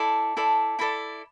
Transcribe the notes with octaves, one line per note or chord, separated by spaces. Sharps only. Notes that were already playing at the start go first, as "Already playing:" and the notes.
Already playing: E4 A4 D5 A5
E4 A4 D5
E4 A4 D5 B5